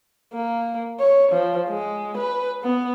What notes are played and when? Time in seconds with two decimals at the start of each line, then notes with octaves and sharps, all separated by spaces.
0.34 A#3
1.00 C#5
1.32 F3
1.70 G#3
2.18 B4
2.64 B3